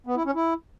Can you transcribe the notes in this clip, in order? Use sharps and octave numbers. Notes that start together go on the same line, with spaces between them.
B3
E4
C#4
E4